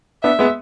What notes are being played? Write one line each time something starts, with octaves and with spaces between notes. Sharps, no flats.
B3 D4 E5
G#3 B3